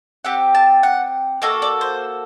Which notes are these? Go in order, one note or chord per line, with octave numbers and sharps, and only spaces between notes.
C4 G4 F#5
A5
F#5
A#3 F#4 A4 D#5
D5
C5